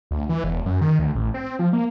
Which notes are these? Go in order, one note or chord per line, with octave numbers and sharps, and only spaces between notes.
D2
E3
E1
F#2
D#3
D2
A1
C4
F3
A#3